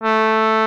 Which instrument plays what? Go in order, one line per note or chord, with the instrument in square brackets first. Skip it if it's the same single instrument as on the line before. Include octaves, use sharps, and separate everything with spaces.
[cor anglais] A3